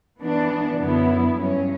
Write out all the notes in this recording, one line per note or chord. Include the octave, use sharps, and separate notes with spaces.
E3 B3 D4
F#2 D3 F#3 B3 E4
G2 F#3 C#4